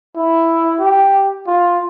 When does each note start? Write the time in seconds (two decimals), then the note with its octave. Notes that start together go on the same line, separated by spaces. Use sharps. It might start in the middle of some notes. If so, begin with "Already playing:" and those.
0.16 E4
0.80 G4
1.47 F4